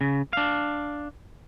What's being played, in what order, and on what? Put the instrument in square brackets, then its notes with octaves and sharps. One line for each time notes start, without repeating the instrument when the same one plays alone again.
[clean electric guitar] C#3
D4 F5